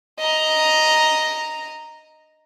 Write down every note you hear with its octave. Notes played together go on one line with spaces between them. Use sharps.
D#5 A#5